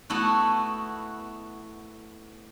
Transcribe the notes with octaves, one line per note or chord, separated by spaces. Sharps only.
A3 B3 E4 F#4